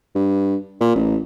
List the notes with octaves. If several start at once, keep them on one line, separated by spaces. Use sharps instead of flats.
G2
A#2
A1